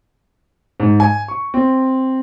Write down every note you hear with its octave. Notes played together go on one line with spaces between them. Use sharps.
G#2
G#5
C#6
C4